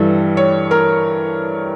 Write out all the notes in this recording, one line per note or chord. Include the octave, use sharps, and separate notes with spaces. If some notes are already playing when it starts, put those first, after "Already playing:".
Already playing: G2 E3 G3 A4
C#5
A#4